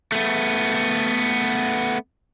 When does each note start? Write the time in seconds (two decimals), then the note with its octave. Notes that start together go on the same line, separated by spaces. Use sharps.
0.12 A3 B3